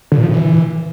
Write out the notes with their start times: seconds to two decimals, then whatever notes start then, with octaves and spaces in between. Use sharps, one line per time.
0.12 D3
0.17 A#2
0.23 F3
0.28 A2
0.34 E3